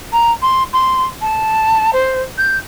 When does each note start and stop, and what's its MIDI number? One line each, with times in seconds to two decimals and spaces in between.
0.12 0.31 82
0.42 0.63 84
0.73 1.06 84
1.21 1.90 81
1.93 2.22 72
2.38 2.57 91